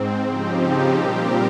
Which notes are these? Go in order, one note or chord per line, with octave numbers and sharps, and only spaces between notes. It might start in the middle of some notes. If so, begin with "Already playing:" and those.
Already playing: G#2 C4
C#3 F3 C4 D#4 G4
A#2 G3 C4 G4 A#4